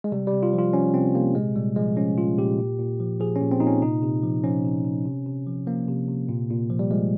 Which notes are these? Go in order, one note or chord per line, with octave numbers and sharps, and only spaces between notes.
G#3
C3 G3
G3
C3
F4
F3 F4
F3 C#4
C3 C4
C3 A#3
A#2 G#3
A#2 G3
F3 G#3
F3 C#4
A#2 F4
A#2 G4
A#2
A#2
F3
F3 G#4
A#2 C#4
C4
A#2 D#4
C#4
C3 D#4
C3
F3
F3 C#4
C3
C3
C3
C3
F3
F3 A#3
C3
C3
A#2
A#2
F3
G3
F3 G#3